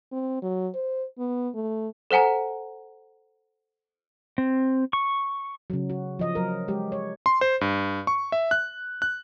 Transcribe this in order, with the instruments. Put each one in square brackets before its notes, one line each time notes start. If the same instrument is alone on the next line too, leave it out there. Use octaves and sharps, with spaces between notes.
[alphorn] C4
F#3
C5
B3
A3
[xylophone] A4 C5 F#5 G#5 A#5
[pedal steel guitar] C4
C#6
[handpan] C#3 F#3
F#4
F3 D#5
F#3 A#4
G#3 G4
C#5
[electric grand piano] C6
C5
G2
C#6
E5
F#6
F#6